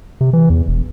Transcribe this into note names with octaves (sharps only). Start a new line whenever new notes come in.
C3
E3
E2
E1